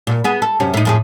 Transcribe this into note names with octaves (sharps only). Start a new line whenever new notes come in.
A#2
B3 G#4
A4
F#2 C3 C#4
A2 D#4
F2 A2 G#4